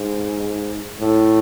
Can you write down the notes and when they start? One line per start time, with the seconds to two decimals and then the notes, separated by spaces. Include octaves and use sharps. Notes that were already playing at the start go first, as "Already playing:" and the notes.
Already playing: G#2
1.00 A2